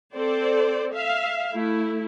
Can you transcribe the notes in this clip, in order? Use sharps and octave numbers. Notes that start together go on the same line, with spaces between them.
C4 A4 C5 D5
E5 F5
A3 E4